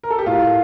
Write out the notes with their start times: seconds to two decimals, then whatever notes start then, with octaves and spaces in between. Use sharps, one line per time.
0.03 A#4
0.11 A4
0.19 G4
0.26 A2 F4